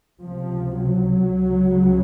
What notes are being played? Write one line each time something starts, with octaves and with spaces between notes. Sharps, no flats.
C#2 C3 F3
F#3
C#2 C#3